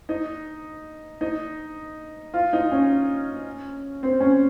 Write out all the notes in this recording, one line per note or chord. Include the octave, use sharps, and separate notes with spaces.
D#4
D#4
F4
D#4
C#4
C4
C#4